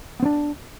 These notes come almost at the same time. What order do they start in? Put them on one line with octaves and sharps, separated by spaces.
B3 C4 D4